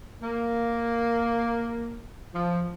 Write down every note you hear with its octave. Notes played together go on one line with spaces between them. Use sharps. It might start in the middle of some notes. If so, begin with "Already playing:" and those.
A#3
F3